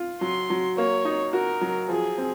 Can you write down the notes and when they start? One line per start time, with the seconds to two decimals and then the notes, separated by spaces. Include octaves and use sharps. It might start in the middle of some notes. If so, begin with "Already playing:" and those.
Already playing: F4
0.21 F#3 C6
0.50 F#3
0.78 A#3 C#5
1.05 D#4
1.33 F#4 A#4
1.61 F#3
1.89 F3 G#4
2.18 C4